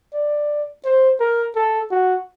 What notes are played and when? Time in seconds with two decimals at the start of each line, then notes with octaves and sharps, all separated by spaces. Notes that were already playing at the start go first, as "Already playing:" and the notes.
0.14 D5
0.85 C5
1.20 A#4
1.56 A4
1.91 F#4